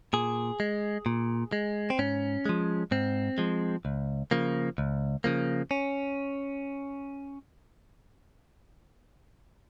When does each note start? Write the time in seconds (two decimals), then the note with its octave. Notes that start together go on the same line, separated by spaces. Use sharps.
0.13 A#2 G#4
0.60 G#3
1.06 A#2
1.53 G#3
1.90 C4
1.99 G#2 C#4
2.46 F3 G#3
2.91 G#2 C4
3.38 F3 G#3
3.85 C#2
4.31 C#3 F3 A#3
4.78 C#2
5.24 C#3 F3 A#3
5.71 C#4